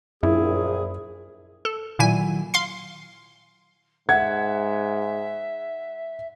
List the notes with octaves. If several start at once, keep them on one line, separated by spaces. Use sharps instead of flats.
A#1 F#2 E4 G#4
A4
A#2 D#3 F#3 E4 G#5
F5 C6 C7
G#2 E5 F#5 G#6